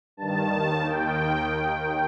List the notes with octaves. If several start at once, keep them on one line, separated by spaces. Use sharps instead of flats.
G2 D#3 A5
D#2 D#3
D#2 D#3 G5